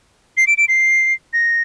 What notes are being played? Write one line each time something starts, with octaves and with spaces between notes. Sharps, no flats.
C7
D7
D7
C7
A#6